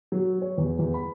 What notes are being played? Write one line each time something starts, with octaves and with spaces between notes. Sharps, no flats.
F#3
C#5
E2
E2
B5